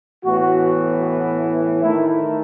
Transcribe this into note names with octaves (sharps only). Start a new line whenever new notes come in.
A2 E3 B3 F#4
D#3 A3 E4